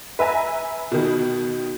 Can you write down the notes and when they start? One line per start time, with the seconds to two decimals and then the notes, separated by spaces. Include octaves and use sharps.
0.19 B4 E5 G#5 A#5
0.92 B2 D#3